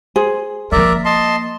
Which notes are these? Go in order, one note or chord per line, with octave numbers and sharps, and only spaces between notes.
G#4 C5
F3 A#3 A#4 D5 E5
D#5 A5 C6